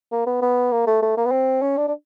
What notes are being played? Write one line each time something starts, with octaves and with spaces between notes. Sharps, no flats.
A#3
B3
B3
A#3
A3
A3
A#3
B3
C4
C#4
D4
D4